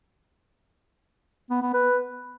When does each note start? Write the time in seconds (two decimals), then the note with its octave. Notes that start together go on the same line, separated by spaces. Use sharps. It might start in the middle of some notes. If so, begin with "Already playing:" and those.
1.50 B3
1.62 B3
1.74 B4